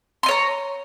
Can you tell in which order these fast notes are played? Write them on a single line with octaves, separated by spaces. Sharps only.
C6 D#5 C#5 A#5